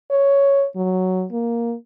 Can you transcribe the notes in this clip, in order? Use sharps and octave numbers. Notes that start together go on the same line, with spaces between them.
C#5
F#3
A#3